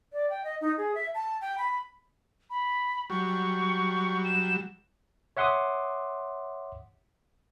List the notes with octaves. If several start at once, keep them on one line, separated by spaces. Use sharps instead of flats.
D5
G5
D#5
D#4
G#4
E5
A5
G5
B5
B5
F#3 G3 C#6
E7
C#5 E5 F#5 C6 D6 D#6